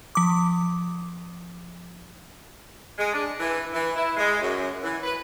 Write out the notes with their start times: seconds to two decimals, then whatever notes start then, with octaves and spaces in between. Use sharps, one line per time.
0.15 F3 D6
2.98 G#3
3.13 D4
3.39 E3
3.73 E3
3.96 E4
4.17 G#3
4.42 F#2
4.83 E3
5.04 B4